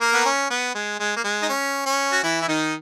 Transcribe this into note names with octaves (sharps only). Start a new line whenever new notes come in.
A#3 A#4
B3
C#4
B3
G#3
G#3
A#3
G#3
D#4
C#4
C#4
F#4
E3 E4
E4
D#3 D#4